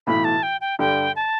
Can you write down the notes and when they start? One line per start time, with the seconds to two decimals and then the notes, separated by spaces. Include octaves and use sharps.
0.07 B1 A2 E3 B5
0.24 A5
0.43 G5
0.61 G5
0.79 G2 D3 G3 G5
1.16 A5